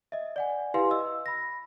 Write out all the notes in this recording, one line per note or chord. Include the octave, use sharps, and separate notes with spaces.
D#5 E5
D5 F#5 G#5
E4 G4 B4 F5 G#5 C6
D#5 E6
B5 A#6